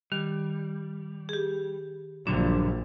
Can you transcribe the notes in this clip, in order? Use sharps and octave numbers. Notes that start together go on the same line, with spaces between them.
D#3 G3
G4 G#4
A#1 G2 D3 F#3 D4